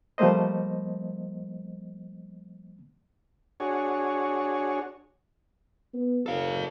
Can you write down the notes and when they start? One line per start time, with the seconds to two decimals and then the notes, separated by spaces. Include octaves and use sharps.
0.18 F3 G3 A3 A#3 C5 D#5
3.60 D4 F#4 G#4 C#5
5.94 B3
6.26 F#1 A4 F5